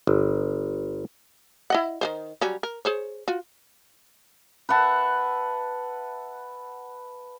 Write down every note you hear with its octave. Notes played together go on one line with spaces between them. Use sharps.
G1
E4 D#5 F#5
D#3 G#3 C5
F#3 G3 C#4
A#4
G#4 C5 C#5
F4 F#4
B4 E5 F#5 A5